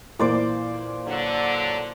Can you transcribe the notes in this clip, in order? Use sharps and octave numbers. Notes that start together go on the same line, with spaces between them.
A#2 E3 A#3 C5 D5 D6
D3 F#3